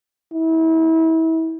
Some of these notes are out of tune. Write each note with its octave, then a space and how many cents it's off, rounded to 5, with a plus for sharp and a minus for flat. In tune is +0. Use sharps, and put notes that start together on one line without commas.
E4 -30